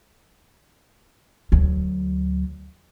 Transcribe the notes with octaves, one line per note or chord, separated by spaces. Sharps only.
D2 F#3